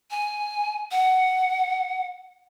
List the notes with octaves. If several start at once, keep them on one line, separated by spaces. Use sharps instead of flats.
G#5
F#5